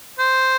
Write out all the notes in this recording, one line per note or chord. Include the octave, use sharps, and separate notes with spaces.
C5